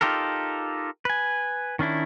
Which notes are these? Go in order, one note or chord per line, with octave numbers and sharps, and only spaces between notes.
D#4 F4 G4 A4 A#4
B4 G#5
D#3 C#4 D4 E4